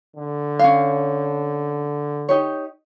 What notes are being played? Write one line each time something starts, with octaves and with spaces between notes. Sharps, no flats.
D3
C#4 F5
D#4 G4 C#5